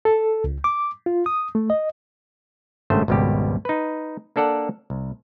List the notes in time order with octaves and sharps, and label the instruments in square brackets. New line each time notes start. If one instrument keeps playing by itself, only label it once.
[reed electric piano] A4
C#2
D6
F4
D#6
A3
D#5
[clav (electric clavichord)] G#1 G2 C#3 A3 C5
G#1 C#2 B2 G3 G4
D#4 B4
A#3 D4 A4 D5 F#5 A5
C2